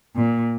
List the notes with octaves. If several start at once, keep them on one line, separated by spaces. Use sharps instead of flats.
A#2